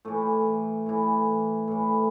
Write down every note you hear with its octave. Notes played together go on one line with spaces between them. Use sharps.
A2 E3 A3
A2 E3
A2 E3